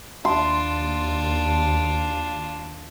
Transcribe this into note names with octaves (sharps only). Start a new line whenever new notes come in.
D#2 D4 F4 C6